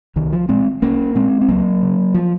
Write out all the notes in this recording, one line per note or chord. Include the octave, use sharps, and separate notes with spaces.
C2 D#3
F3
A#2 G#3 C4
C2 A#3 C#4
A#2 G#3 C4
C4
C#2 F#3 A#3
C#3
F3